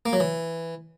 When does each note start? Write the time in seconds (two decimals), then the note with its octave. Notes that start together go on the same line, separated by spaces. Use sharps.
0.06 A#3
0.13 F#3
0.20 E3